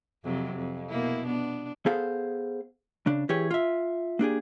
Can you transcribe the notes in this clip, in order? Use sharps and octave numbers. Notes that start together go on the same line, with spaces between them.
F2 C3 F#3
F2
B2 A#3 E4
B3 D4
B3 G#4 A4 C5 F5
C#3 D4
E3 G4 G#4 C#5
F4 E5
A#3 D4 G4 G#4